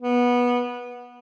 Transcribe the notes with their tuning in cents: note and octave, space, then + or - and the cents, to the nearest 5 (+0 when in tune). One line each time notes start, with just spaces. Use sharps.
B3 -15